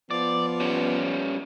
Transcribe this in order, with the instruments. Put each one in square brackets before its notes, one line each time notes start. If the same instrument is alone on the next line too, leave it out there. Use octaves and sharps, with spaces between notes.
[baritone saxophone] F3 [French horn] B3 [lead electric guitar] D5
[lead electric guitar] G3 C#4